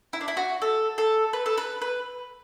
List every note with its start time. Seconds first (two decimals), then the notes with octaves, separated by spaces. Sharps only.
0.13 E4
0.21 D4
0.28 E4
0.37 F#4
0.62 A4
0.98 A4
1.33 B4
1.46 A4
1.58 B4
1.82 B4